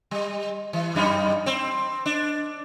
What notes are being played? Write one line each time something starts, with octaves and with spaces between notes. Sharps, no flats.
G3
E3
F#2 G3 D#4
C4
D4